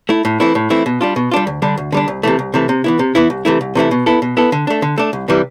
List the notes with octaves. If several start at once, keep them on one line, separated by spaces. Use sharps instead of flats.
A3 E4
A2
E3 A3 C4 E4
A2
E3 A3 C4 E4
B2
G3 D4 F4
B2
G3 D4 F4
D2
D3 G3 D4
D2
D3 G3 D4
C2
C3 E3 A3
C2
C3 E3 A3
C3
E3 B3 E4
C3
E3 B3 E4
C2
C3 E3 A3 E4
C2
C3 E3 A3 E4
B2
B3 E4 A4
B2
B3 E4 A4
D3
A3 D4
D3
A3 D4
C2
C3 E3 G3